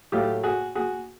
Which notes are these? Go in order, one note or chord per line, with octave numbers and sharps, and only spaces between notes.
A2 F#3 A3 F4 G4
F#4 G#4
F#4 G#4